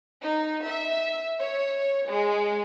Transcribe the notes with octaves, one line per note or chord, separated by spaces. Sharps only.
D#4
E5
C#5
G#3